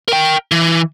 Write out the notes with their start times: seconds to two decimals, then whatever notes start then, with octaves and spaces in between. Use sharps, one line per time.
0.08 A#4 G5
0.52 E3